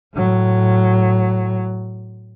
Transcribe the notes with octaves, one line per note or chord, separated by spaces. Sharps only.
A2 F#3